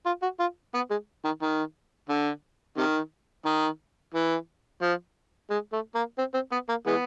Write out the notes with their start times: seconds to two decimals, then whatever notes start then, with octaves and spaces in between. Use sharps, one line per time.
0.06 F4
0.22 F#4
0.39 F4
0.74 B3
0.90 G#3
1.25 D#3
1.42 D#3
2.09 D3
2.78 C3 D#3
3.46 D#3
4.14 E3
4.82 F3
5.50 G#3
5.72 A3
5.95 A#3
6.18 C4
6.34 C4
6.52 B3
6.69 A#3
6.86 E3 G#3 B3